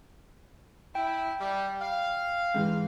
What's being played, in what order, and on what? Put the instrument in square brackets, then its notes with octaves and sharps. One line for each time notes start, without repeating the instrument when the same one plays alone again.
[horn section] E4 [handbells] G5
[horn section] G3
F5
[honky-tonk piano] G#2 E3 G#3